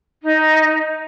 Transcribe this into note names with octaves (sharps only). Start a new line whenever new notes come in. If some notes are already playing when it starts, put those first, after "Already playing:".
D#4